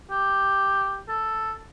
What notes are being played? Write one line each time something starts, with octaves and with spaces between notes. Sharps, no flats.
G4
A4